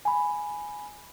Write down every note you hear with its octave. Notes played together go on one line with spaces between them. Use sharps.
G#5 B5